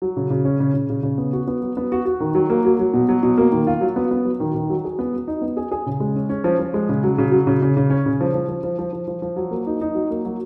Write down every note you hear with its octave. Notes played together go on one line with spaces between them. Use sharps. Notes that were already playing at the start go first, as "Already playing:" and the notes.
F#3
C#3
C#3
C#4
C#3
C#3
C#3
C#3
B3
F#4
B3
F#3
B3
F#4
F#4
D#3
F#3
A#3
F#3
F#3
B2
F#3
B2
A#3
D#3
F4
F#3
B3
B3
F#3
D#3
D#3
F#3
G#4
B3
F#3
D#4
B3
G#4
G#4
C#3
G#3
C#4
C#4
F3
F3
G#3
C#3
F#3
C#3
F#3
C#3
C#3
C#3
C#4
C#3
F3
F3
F3
F3
F3
F3
F3
F3
F#3
A#3
D#4
D#4
F#3
A#3
F#3